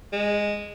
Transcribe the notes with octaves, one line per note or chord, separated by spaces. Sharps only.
G#3